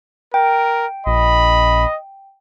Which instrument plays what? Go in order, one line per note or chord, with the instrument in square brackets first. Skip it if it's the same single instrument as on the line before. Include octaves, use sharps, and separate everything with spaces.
[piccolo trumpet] A#4 [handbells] G5
[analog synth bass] A#1 [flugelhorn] D#5 [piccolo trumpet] B5